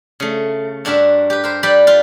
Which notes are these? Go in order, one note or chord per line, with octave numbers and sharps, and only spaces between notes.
C#3 A3
G2 D4 F#4 A#4 E5
G4 B4
A#4 C5
G3 G4 B4 D5 G5 B5
F4 B4